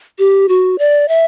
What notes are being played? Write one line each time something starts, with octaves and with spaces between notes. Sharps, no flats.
G4
F#4
D5
E5